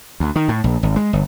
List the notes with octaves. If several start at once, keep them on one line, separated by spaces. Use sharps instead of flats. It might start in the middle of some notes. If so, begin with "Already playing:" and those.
D2
D#3
A2
A#1
G#1
G#3
G1